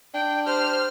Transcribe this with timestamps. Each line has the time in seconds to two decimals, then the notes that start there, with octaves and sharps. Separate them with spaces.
0.14 D4 G5
0.47 G4 C5 F6